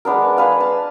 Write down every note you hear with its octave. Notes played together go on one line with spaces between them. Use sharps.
G#3 B3 D4 A#4
G#4 B4 F5 A#5
A5